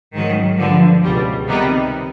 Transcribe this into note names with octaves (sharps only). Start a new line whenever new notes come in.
G#2 D#3 F#3
G2 D3 F3
C#2 B2 G3
C3 D#3 G3 B3 D#4